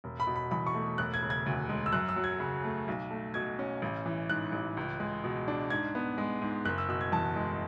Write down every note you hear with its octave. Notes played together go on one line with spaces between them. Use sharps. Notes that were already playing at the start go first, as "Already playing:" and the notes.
E1
B5
B2
B5
E2 B5
C#6
A3
E1 F#6
G#6
C#3
G#6
D2
G#3
E6
F#2 F#6
E6
F#3
G#6
C#3
A3
B1
A3
B2 G#6
C#4
A1
E3
G#2 F#6
A1
C#2
G#3
B2
D4
G#2 G#6
B3
G#3
G#2
F#1 F#6
E6
B2 E6
G#6
E2 A5
G#3